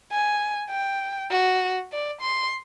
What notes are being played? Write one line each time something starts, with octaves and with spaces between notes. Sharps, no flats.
G#5
G5
F#4
D5
C6